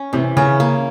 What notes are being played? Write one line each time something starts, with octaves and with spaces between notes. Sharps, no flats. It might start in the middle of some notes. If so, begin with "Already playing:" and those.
Already playing: C#4
C3 E3
C#3 C#4
A#3